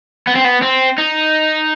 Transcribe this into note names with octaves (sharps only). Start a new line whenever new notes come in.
B3
C4
B3
C4
D#4